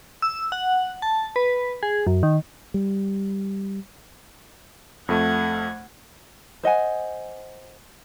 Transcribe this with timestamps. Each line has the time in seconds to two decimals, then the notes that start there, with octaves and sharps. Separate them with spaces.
0.22 E6
0.52 F#5
1.02 A5
1.36 B4
1.83 G#4
2.07 F#2
2.23 D#3
2.74 G3
5.09 F2 A3 F#5 G#6
6.63 C5 D#5 F#5 G#5